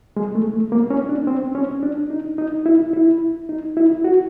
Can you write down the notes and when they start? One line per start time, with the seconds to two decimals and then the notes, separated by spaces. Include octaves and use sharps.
0.17 G#3
0.35 A3
0.53 A3
0.72 A#3
0.90 C#4
1.09 D4
1.27 C4
1.55 C#4
1.83 D4
2.10 D#4
2.38 D#4
2.66 E4
2.93 E4
3.49 D#4
3.77 E4
4.04 F#4